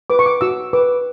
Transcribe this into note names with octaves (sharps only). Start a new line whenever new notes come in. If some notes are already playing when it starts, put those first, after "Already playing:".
B4 D6
C#6
D6
F#4 E6
B4 D6